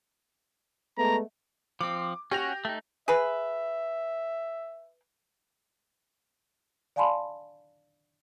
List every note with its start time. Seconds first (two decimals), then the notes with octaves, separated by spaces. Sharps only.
0.98 G#3 A3 B3 A#5
1.81 F3 C4 D6
2.32 C#4 F#4 G4 A#6 F7
2.65 A3 D#4
3.08 G#4 B4 E5
6.96 D5 F5 G#5 A5 B5 C6